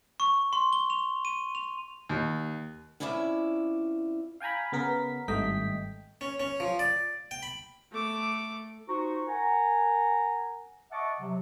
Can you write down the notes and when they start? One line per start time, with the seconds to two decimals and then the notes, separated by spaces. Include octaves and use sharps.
0.20 C#6
0.53 C6
0.73 G7
0.90 F7
1.25 D#7
1.55 F7
2.09 D#2
3.00 F2 C#4 E4 D5 E5
4.40 F5 G5 G#5 A#5 B5
4.72 C#3 B3 A#4 B6
5.28 G#1 G2 A3 D#5 G5 B6
6.21 C#4
6.40 C#4
6.60 F3
6.79 D5
7.31 G5
7.43 B5
7.92 A3 D6
8.88 D#4 F4 F#4 C5 A#5 C#6
9.27 A#4 F#5 G#5 A#5
10.91 D#5 E5 F#5 A5 C#6 D6
11.20 C3 F#3